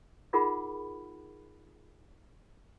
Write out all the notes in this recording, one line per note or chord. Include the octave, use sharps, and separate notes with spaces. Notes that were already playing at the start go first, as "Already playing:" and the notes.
D#4 F4 G#4 A#4 F#5 B5